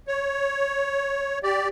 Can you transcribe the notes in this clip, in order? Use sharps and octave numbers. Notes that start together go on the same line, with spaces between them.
C#5
G4 D5